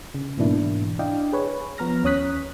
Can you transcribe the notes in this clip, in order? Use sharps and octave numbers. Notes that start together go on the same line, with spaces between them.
C#3
G#2 B2 E3 A#3 D4 E4
D4 E4 D5 D#5 F5 G5
G#4 B4 C#5
F3 B3 A#5 F6 A#6
D#2 C#4 C#5 D#6 F#6 B6